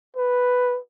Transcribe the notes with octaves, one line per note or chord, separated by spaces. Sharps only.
B4